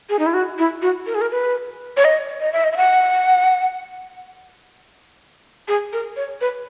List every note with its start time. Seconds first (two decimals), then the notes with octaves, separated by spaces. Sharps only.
0.09 G#4
0.19 D#4
0.26 E4
0.34 F#4
0.58 E4
0.82 F#4
1.07 A#4
1.15 G#4
1.21 A#4
1.31 B4
1.97 C#5
2.05 D#5
2.41 D#5
2.53 E5
2.64 D#5
2.72 E5
2.77 F#5
5.68 G#4
5.93 A#4
6.16 C#5
6.41 B4